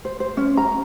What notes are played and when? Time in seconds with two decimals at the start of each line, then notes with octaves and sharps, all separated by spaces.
0.05 C5
0.20 C5
0.37 C#4
0.57 A#5